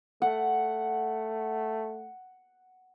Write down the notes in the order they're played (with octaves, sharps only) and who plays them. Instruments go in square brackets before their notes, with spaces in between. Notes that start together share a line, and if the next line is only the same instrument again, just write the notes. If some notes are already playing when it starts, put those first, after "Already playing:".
[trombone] A3 [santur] F#5